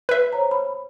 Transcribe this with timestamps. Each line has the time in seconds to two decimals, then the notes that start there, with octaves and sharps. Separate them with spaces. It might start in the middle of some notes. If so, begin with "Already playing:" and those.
0.09 B4 E5
0.33 C5 C#5 A#5
0.51 B5